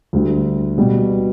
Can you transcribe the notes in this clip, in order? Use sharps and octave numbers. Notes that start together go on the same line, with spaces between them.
D2 D3 G3
B2 G3 B3